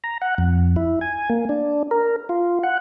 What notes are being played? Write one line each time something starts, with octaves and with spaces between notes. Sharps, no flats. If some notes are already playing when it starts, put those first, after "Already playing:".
A#5
F#5
F2
E4
G#5
A#3
D4
A#4
F4
F#5